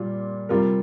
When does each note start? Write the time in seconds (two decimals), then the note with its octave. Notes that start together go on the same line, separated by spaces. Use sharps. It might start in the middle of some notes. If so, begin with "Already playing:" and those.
Already playing: A#2 G3 F4
0.49 C3 G3 F4 A#4